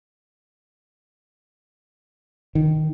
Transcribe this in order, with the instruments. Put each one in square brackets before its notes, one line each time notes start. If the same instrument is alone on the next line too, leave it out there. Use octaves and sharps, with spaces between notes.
[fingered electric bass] D#3